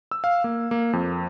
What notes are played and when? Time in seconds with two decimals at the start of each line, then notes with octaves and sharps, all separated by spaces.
0.11 E6
0.24 F5
0.44 A#3
0.71 A#3
0.93 F2